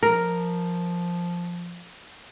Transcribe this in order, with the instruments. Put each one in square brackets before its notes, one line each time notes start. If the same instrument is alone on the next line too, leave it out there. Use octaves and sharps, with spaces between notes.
[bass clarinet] F3 [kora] A#4